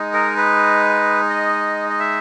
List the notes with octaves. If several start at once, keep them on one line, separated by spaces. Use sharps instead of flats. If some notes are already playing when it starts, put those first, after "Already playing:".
Already playing: G#3 D#4
A#4
B4
D#5
D#5
E5